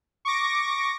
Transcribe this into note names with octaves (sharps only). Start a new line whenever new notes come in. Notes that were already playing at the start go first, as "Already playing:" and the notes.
C#6 D6 A#6